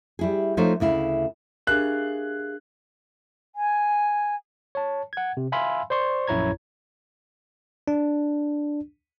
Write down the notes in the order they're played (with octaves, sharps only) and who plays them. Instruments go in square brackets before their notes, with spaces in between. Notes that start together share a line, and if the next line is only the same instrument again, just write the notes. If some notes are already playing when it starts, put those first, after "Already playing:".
[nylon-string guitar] G3 E4 G#4
F3 A3 D#4 C5 C#5 D#5
D2 C#3 E4 F5
[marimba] D4 G4 A#4 [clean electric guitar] G#4 E5 F5 [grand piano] F#6
[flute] G#5
[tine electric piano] C#5 A5
F#5 G#6
C3
E5 F5 G#5 B5 C6 E6
C5 D5 C6 C#6
A#1 F#2 E4 C#5 A#5 G#6
D4